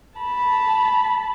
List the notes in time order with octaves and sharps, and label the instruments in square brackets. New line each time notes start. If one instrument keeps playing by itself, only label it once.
[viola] A5 B5